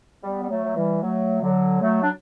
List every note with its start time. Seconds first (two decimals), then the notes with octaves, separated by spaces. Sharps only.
0.23 G3 B3
0.43 G3
0.50 F#3 A3
0.65 F#3
0.76 E3 G3
1.02 F#3 A3
1.42 D3 F#3
1.81 F#3 A3
2.02 D4